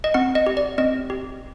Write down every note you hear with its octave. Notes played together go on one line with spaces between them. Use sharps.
D#5
C4 F#5
D#5
G4
D5
C4 D#5
G4